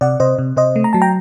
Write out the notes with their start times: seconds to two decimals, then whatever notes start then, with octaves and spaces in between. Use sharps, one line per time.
0.01 C3 D5 F#5
0.20 C3 C5 D#5
0.39 C3
0.57 C3 C5 D#5
0.76 A3
0.84 A#5
0.93 F#3 A5
1.02 G5 A#5